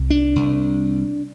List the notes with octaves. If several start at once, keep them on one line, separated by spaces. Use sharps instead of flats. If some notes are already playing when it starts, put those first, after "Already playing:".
Already playing: C2
D4
C2